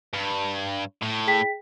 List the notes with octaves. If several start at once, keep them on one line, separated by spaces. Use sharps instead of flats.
G2
A2
G#4 G5 B6